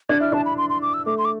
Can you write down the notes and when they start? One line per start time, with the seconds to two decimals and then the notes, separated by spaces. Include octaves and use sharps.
0.09 D4 G#6
0.20 E4 F6
0.32 D4 A5
0.45 B5
0.58 C6
0.70 C6
0.82 D6
0.94 E6
1.06 A3 D6
1.18 C6
1.25 D6